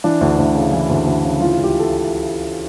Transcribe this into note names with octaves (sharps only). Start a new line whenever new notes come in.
E3 D4
D2
D2
C#3
E3 E4
D2
D2
C#3
E3 F4
C#2
G4
A4